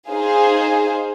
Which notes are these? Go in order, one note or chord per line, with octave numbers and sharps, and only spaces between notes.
D#4 G#4 C5 F5